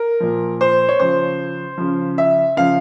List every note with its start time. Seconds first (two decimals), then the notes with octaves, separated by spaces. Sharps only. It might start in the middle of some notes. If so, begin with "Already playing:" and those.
Already playing: A#4
0.20 A#2 F3
0.61 C5
0.89 C#5
1.00 C#3 F3 C5
1.78 C#3 F3
2.18 E5
2.57 C#3 F3 F5